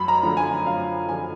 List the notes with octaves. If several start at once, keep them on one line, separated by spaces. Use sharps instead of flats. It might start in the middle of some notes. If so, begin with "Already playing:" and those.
Already playing: F#2 B5
A#5
D3 F3
G#5
F#2 F5
D3 F3 G#5